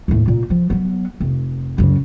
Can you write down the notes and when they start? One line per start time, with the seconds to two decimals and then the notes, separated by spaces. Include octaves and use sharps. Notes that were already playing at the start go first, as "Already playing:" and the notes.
0.08 D#2 A2
0.28 A#2
0.50 F3
0.70 F#3 B3
1.20 F1
1.78 F#2 C#3